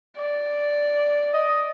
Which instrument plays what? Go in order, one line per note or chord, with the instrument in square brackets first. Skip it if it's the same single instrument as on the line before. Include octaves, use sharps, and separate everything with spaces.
[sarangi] D5
[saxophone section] D#5